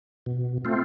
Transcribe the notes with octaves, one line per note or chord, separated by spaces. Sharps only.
B2
A3 C4 F4